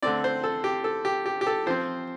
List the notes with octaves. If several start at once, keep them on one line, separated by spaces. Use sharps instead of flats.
D3 A3 C4 D5
C5
A4
G4
A4
G4
G4
G4
A4
F3 C4 C5